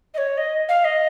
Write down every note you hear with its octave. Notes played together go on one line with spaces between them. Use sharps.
D#5
C#5
D#5
F5
D#5